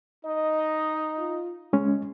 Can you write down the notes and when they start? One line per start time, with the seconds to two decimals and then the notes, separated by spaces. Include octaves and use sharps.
0.25 D#4 D#5
1.18 F4
1.73 C#3 G#3 C#4